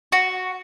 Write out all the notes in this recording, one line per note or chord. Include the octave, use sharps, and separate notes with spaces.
F#4